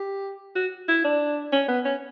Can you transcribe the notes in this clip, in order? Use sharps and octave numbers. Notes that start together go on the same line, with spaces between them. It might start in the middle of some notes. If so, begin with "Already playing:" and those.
Already playing: G4
F#4
E4
D4
C#4
B3
C#4